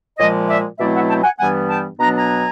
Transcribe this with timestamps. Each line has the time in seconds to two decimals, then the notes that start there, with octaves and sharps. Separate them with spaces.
0.18 A#2 F3 G#3 C#5 D#5
0.48 D5 E5
0.79 B2 F#3 A3 C4 E4 D5 E5
0.94 E5 F#5
1.09 G5 A5
1.23 F#5 G#5
1.39 G2 E3 G3 B3 F#5 G#5
1.69 G5 A5
1.99 B2 F#3 B3 D4 A#5
2.16 G#5 A#5